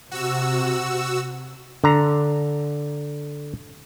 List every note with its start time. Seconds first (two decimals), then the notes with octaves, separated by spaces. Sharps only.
0.11 C3 F#4 E6
1.84 D3 A#5